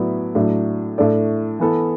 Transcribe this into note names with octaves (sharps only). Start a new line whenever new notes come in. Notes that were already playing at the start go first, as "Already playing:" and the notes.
Already playing: A2 F#3 B3 E4 D5
A2 F#3 D4
A2 A3 D4 A4 D5
E3 B3 E4 A4